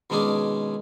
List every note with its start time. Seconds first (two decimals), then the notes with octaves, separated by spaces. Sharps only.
0.10 B2 D#3 G#3 C#4 D4 G#4